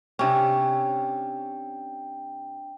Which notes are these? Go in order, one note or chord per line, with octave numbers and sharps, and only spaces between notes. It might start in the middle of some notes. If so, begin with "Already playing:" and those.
C3 C#4 D4 G5